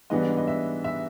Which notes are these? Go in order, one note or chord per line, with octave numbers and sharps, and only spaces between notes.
G#2 E3 G3 B3 D4 D#5
D#5
E5
E5